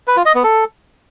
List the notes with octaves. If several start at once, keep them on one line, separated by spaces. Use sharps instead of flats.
B4
F4
D#5
B3
A4